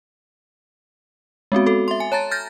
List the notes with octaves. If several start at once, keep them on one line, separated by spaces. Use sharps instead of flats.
G#3 B3 C4 F#4
F#4 A4
E5 C6
G#5
C#5 A5 A#5 A6
F6 G6 A6 A#6